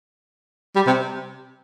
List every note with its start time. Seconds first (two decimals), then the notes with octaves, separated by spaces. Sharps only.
0.76 G3
0.87 C3